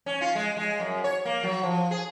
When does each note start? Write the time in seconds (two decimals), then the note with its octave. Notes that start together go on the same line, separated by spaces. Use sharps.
0.06 C#4
0.21 F4
0.35 G#3
0.57 G#3
0.80 F#2
1.04 C#5
1.25 A#3
1.43 F#3
1.63 F3
1.91 G#4